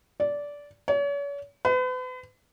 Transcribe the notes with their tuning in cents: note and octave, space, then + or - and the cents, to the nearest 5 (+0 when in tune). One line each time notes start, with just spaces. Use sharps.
D5 -15
C#5 +40
B4 +40